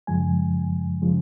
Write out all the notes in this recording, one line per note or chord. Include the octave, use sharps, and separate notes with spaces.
F#2 C#3 F3 G#3 G#5
C#3 F3 G#3